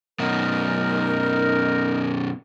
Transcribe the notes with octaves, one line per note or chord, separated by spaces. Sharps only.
F#2 B2 D#4 A#4